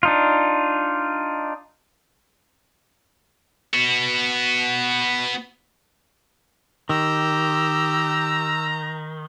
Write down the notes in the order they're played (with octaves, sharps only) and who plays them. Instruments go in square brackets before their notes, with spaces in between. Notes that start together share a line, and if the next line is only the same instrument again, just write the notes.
[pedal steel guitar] D4 D#4 F4
[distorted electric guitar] B3 F#4
[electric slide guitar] D#3 [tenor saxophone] G4 [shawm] A#5 [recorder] E6